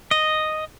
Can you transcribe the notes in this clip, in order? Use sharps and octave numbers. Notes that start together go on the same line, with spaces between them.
D#5